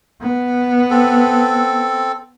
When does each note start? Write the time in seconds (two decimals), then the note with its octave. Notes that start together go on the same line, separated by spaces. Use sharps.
0.21 B3
0.90 C4 A4